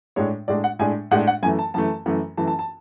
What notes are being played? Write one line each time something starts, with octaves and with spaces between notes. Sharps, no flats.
A2 G#3 D4 C#5
A2 G#3 D4 D5
F#5
A2 G#3 D4 G#5
A2 G#3 D4 F#5
F#5
F#2 E3 A3 G#5
A5
F#2 E3 A3 A5
F#2 E3 A3
F#2 E3 A3 A5
A5
A5